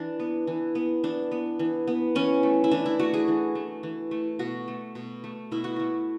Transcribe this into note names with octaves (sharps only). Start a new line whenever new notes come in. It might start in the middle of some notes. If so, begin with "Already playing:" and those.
Already playing: E3 D4
B3
E3
B3
E3 D4
B3
E3
B3
E3 C#4
A3
E4
E3 D4
E4
A3 F#4
G#4
E3
A3
E3
A3
B2 F#4
A3
B2
A3
B2 E4
F#4
A3 E4